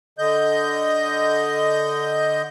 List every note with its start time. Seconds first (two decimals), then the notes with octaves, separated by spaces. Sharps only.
0.18 D3 D#5 G6